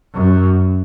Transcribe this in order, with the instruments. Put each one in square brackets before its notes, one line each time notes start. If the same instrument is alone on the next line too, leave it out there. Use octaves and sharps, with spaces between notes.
[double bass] F#2